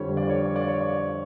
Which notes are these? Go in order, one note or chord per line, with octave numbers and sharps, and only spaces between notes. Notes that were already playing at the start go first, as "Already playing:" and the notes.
Already playing: F2 D3 G3 C#5
D5
C#5
D5
D5
C#5
D5